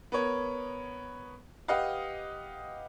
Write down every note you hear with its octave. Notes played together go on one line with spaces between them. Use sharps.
B3 A#4 C#5
G4 B4 D#5 F5 F#5